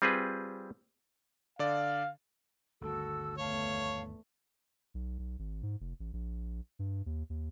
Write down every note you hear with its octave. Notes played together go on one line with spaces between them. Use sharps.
G3 C4 F4 G#4 B4
D3 D5 F5
G1 D2 D#3 F#4 A4 E6
E2 A3 C#5 F5 A5
B1
B1
G#1
G#2
F1
A1
A#1
G2
D#2
D#2